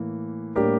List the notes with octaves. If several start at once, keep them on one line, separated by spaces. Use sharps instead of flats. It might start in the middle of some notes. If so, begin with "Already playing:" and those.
Already playing: A2 E3 A#3
A2 G3 A#3 D4 G4 A#4